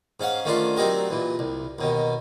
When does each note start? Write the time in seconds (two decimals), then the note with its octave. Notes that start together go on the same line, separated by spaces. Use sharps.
0.20 G#2 C#4 F5 F#5
0.45 D#3 A3 C#4 D4 F4 C6
0.77 F#3 C4 D4 D#4 G4 A#4
1.10 A#2 E3
1.39 C2
1.79 D#2 B2 D#3